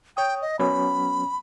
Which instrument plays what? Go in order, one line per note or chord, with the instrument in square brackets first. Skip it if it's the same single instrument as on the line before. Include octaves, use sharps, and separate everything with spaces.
[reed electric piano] C#5 D#6 [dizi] G5
[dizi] D#5
[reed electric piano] F#3 B3 C#4 [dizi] B5